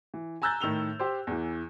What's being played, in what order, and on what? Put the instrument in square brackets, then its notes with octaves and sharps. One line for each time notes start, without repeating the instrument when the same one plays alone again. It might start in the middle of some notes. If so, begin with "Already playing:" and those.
[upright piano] E3
G#5 A#5 E6 F#6 G6 A6
A2 D#3 E6 F7 G7
G4 C5
E2 E3